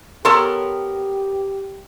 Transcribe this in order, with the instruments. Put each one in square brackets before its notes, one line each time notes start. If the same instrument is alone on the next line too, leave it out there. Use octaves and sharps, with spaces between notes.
[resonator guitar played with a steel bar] B3 A#4 [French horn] G4 [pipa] A4 C#5 C6